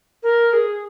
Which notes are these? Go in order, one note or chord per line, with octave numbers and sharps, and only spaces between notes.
A#4
G#4